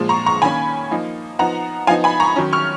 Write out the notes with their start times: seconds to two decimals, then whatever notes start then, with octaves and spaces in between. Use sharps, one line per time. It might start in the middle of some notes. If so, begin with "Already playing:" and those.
Already playing: A#2 F3 G#3
0.09 A#5 C#6
0.26 A#5 C#6
0.42 D#3 A#3 C#4 G#5 B5
0.91 F3 A#3 D#4
1.39 F3 B3 D#4 F#5 A#5
1.87 F3 B3 D#4 F5 G#5
2.04 G#5 B5
2.20 A#5 C#6
2.36 D#3 F#3 C#4
2.53 C#6 F6